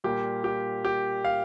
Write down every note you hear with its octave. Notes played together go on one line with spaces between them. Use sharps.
A#2 G3 A#3 G4
G4
G4
F5